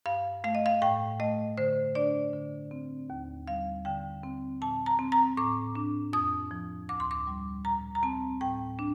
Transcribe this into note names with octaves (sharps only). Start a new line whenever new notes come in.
G2 F5
A3 F5
D#5
F5
A2 G5
A3 D#5
D3 C5
D4 D5
D3
C4
D#2
G3 F5
D3 G5
C4
A#2 A5
A#5
C4
A#5
A2 D6
D4
F2 D#6
F3
D2 D6
C6
D6
G3
A#2 A#5
A#5
C4 A5
A2 G5
D4